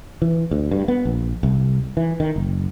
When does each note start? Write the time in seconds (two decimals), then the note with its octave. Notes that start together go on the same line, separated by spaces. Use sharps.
0.22 E3
0.51 D2
0.71 G2
0.88 B3
1.05 A#1
1.43 C2
1.97 E3
2.20 D#3
2.36 F#1